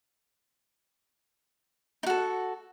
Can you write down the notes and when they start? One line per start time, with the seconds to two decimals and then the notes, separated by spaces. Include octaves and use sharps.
2.03 D#4
2.06 F#4
2.10 A4